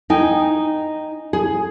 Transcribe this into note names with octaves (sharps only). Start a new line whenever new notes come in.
D#4 G5 G#5
G#4